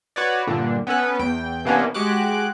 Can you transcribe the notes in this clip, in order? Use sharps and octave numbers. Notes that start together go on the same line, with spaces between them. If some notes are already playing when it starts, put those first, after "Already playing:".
F#4 B4 C#5 D5
G2 A#2 D3 D4
B3 C#4 A4 B4
E2 G5
C3 E3 A#3 B3 C#4 D4
G#3 F#4 G4 D6 F#6